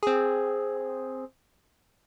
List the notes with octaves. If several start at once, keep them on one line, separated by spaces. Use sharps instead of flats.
C4 G#4